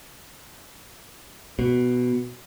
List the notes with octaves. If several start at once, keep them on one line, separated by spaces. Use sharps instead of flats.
B2